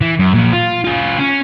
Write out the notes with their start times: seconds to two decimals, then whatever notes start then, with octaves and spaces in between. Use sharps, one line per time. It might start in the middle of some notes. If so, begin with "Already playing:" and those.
0.01 E3
0.19 F#2
0.34 A#2 F3
0.53 F4
0.84 F4 G#4
1.20 C#4